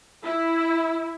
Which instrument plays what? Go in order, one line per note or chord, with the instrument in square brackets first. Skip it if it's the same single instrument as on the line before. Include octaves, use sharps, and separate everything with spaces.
[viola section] E4